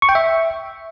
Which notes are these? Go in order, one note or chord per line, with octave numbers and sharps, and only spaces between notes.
C#6
G5
E5